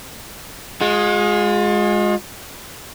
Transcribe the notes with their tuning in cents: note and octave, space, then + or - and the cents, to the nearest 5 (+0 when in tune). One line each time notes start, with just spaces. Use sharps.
G#3 +0 F4 +40